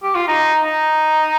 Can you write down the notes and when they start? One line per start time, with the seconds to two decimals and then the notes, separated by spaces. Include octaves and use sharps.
0.03 G4
0.15 F4
0.28 D#4
0.64 D#4